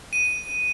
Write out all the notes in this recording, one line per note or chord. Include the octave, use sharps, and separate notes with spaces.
D#7